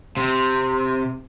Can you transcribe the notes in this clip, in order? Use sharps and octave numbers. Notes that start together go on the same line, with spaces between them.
C3